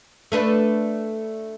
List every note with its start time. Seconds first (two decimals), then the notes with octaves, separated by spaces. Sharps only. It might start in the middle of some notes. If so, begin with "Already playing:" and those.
0.32 A3 D4 B4